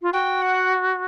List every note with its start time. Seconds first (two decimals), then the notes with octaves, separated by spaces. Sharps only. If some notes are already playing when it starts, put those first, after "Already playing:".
0.02 F4
0.13 F#4 G5
0.42 F#5